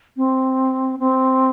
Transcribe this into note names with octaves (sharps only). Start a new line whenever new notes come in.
C4
C4